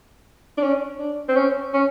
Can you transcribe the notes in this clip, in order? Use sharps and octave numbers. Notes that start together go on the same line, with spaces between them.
D4
C#4
D4
C4
C#4
C#4